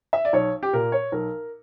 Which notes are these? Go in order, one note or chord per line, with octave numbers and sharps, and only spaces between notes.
E5
D5
B1 C#5
G4
A#2 A#4
C#5
B1 A#4